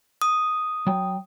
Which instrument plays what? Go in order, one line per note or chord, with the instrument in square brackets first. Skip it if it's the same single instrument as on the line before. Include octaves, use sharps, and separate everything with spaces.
[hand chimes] D#6
[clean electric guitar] F#3 G5